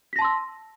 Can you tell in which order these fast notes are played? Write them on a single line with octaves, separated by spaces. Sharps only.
B6 A#6 A5 C6 E6